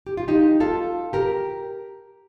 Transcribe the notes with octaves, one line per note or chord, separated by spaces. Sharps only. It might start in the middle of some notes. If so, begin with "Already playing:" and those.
G4
F4
D#4 G4
F4 A4
G4 A#4